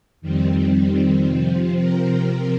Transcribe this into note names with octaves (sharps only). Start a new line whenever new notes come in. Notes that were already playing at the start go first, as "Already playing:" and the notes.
F2 D#3 G3 C4
C3 F3 C4
A#4